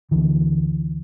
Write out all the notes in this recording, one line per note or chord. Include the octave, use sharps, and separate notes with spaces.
D2 D3 E3